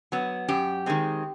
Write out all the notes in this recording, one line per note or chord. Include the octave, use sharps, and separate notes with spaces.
F#3 B3
F#2 G4
D#3 G#3 C4